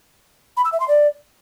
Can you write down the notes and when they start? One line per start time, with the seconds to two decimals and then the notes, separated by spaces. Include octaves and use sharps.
0.57 B5
0.65 E6
0.72 E5
0.80 C6
0.88 D5